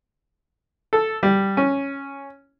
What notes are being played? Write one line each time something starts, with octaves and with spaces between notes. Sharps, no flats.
A4
G3
C#4